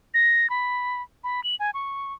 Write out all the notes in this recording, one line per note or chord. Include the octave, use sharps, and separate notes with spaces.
A#6
B5
B5
F#7
G#5
C#6